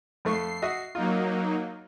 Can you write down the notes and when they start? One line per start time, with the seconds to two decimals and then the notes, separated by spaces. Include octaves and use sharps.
0.25 F2 A3 C#6 C7
0.62 F#4 D#5 E5
0.95 F#3 A#3 D#4 F4